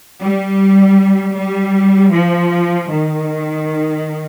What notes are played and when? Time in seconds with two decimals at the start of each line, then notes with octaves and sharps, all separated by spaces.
0.22 G3
1.37 G3
2.13 F3
2.91 D#3